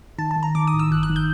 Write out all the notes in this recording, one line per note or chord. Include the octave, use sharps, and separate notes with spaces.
D#3 A5
A5
D#3
A#5
D#3 D6
D#6
A1
E6
G1 F#6
F#6
D#3
G6